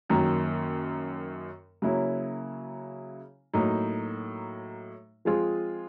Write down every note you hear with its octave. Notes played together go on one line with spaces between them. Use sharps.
F#2 D#3 F#3 A#3
C#3 F#3 A#3 C#4 E4
A2 F#3 A#3 D#4
F3 G#3 C4 F4 G#4